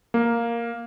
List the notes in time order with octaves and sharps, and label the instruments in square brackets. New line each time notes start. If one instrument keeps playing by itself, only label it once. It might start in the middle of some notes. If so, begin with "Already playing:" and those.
[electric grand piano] A#3